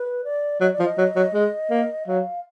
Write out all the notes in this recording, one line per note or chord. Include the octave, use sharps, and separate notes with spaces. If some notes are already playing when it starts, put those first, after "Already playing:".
Already playing: B4
D5
F#3 D#5
D5
F3
D#5
F#3
F#3
G#3
A#3
F#3 F5